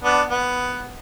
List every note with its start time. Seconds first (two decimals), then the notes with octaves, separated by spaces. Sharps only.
0.03 B3 D4
0.30 B3